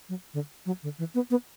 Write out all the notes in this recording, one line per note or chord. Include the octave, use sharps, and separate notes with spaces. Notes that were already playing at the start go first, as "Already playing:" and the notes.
F#3
D3
F#3
D3
E3
B3
B3